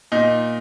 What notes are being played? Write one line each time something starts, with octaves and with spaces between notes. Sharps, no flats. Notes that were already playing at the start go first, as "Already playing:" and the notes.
A#2 D#4